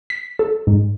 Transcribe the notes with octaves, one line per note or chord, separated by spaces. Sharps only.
B6
A4
G#2